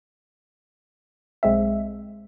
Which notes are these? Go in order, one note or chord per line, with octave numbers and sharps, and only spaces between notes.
B1 G#3 C4 E5